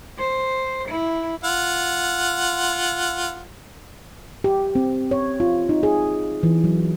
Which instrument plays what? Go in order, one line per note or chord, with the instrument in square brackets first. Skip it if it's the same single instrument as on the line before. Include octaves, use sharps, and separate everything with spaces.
[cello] C5
E4
[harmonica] F4 F#5
[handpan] G4
C4
C#5
F4
D#4
G#4
E3
F#3